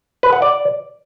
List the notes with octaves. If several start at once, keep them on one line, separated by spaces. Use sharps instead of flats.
B4
F#5
D5